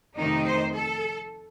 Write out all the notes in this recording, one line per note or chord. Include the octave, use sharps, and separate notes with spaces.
F2 C3 D#3 A3 D#4
C5
A4